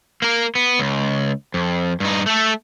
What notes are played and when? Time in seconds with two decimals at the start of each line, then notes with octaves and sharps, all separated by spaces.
0.22 A#3 A#4
0.55 B3
0.79 C#2
1.54 F2
2.00 G2 D#4
2.26 A3 A4